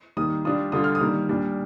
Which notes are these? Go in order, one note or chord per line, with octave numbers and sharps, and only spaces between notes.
D#3 G3 A#3 D#6
G3 D4 F4 D#6
D3 G3 D4 F4 D#6
F6
D#6
D#3 G3 A#3
A#2 G3 D4